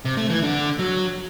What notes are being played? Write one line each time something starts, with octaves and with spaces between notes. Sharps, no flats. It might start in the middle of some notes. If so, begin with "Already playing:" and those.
C3
A3
E3
D3
F#3